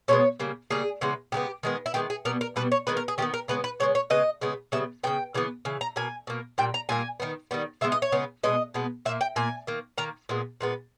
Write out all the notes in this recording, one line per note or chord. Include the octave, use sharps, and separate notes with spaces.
B2 G#3 B3 C#5
C#3 G3 A#3
C#3 G3 A#3 G#4
C#3 E3 G#3 B3
C#3 E3 G#3 B3 G4
D#3 G#3 B3
E4
D#3 G#3 B3 G4
G#4
B2 G3 B3 A#4
A#4
B2 G3 B3 B4
C#5
D#3 G#3 B3 B4
A#4
G#4
D#3 G#3 B3 G4
A#4
C#3 G#3 B3 B4
B4
C#3 G#3 B3 C#5
C#5
C#3 G#3 B3 D#5
C#3 G#3 B3
C#3 G3 B3 E5
C#3 G3 B3 G5
C#3 E3 G#3 B3
C#3 E3
A#5
B2 A#3 G#5
B2 A#3
A#2 G3 G5
A#5
A#2 G3 A#3 G#5
D#3 G3 B3
D#3 G3 B3
C#3 G#3 B3 E5
D#5
C#5
C#3 G#3 B3
B2 G#3 B3 D#5
B2 G#3 B3
A#2 A#3 E5
G5
A#2 A#3 G#5
D#3 A#3
D#3 A#3 A#5
A#2 G#3 B3
A#2 G#3 B3